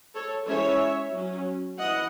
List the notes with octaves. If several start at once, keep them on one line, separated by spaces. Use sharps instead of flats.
A4 C#5
E3 G#3 C#4 C#5 E5
F#3 C#4
E3 D#5 F#5